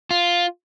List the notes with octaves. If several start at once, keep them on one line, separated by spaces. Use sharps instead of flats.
F4